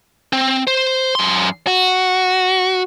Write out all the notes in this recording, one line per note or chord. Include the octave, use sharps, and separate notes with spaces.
C4
C5
F#2 C6
F#4